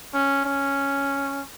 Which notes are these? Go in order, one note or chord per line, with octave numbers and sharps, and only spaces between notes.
C#4
C#4